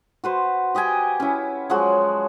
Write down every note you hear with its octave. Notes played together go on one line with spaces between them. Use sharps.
F#4 B4 C5
G4 D#5 G5 G#5
C#4 E4
F3 F#3 G#3 F#4